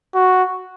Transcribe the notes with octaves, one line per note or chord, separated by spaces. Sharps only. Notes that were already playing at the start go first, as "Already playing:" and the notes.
F#4